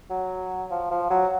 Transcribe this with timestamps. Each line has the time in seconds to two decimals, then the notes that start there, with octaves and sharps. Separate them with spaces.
0.10 F#3
0.71 F3
0.91 F3
1.11 F#3